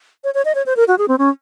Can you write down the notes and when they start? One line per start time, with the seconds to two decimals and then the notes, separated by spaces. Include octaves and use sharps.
0.24 C#5
0.34 C#5
0.45 D#5
0.55 C#5
0.66 C5
0.77 A#4
0.88 F#4
0.98 G#4
1.08 C4
1.18 C#4